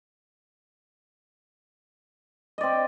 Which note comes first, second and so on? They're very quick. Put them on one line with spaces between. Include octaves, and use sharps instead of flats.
D#5 D5 C4